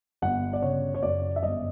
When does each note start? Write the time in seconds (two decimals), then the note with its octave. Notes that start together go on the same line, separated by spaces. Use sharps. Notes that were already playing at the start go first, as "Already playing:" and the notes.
0.22 G1 F#5
0.53 D5
0.62 C#3 C#5
0.94 C#5
1.03 F#2 D5
1.36 E5
1.43 G1 D#5